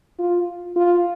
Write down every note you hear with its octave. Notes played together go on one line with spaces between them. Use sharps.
F4
F4